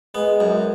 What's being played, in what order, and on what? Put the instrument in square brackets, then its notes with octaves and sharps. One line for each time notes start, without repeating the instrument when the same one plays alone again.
[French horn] G#3 [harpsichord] B3
[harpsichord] F#2